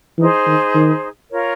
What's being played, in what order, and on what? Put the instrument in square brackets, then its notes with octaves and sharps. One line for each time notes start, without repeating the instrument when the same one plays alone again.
[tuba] E3 [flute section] D#4 G#4 C5
[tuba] D#3
D#3
[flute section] F4 A#4 C#5